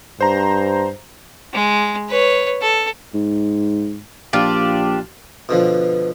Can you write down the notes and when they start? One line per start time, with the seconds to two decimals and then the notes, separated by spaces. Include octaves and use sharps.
0.21 G2 C5 A#5
1.53 G#3
2.08 B4 C#5
2.61 A4
3.14 G#2
4.33 A#1 D4 F4 G4
5.49 B2 D3 F3 B4